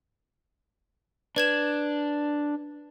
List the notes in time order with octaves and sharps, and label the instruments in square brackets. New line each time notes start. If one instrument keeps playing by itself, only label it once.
[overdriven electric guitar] D4 [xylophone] B4 G#6 E7